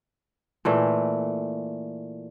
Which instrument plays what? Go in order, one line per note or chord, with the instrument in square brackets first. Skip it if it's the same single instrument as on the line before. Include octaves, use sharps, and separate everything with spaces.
[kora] A#2 E3 A3